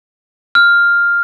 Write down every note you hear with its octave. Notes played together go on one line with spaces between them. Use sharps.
F6